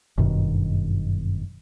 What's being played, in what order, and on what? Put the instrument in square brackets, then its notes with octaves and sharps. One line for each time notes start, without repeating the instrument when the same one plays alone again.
[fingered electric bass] G1 F#2 B2 D#3